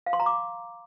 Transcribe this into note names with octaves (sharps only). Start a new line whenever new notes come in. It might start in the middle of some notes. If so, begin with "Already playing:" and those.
F5
C6
A#5
D6